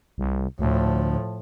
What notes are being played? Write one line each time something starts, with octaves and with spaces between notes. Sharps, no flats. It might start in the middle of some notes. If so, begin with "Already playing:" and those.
C2
D2 A2 F3